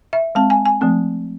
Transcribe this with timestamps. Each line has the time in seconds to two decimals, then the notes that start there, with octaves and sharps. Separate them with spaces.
0.13 E5
0.35 G#3 C4 A5
0.50 G#5
0.66 G#5
0.81 F3 A3 C4